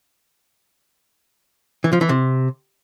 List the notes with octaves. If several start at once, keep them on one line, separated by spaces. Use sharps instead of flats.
E3
F3
E3
C3